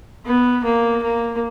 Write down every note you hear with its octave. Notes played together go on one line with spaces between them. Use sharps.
B3
A#3
A#3